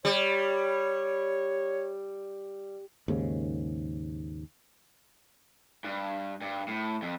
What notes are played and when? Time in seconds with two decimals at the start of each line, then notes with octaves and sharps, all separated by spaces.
0.05 G3 C#5
3.08 D#2 G#2 C#3
5.84 G2
6.42 G2
6.68 A2
7.02 F2